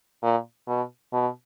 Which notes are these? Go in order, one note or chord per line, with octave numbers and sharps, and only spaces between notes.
A#2
B2
B2